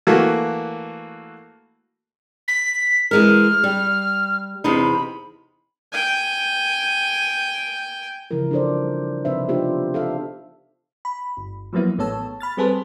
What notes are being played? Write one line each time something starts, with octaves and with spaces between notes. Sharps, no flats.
E3 A3 A#3 F#4
B6
E3 G#3 A#4 F6
G3
E2 C3 D#4 B5
G5 G#5
C#3 E3 F3 E4 A#4
D4 F4 A4 C5 D5
G3
C3 F3 D#4 B4 C5 E5
B3 D4 D#4 F4 G4 C5
A4 E5 F5
B5
G1
F3 F#3 A#3 B3 E4
A1 A3 B3 C#5 A5 E6
B5 F6 A6
G3 C4 G#4 A4 B4 C5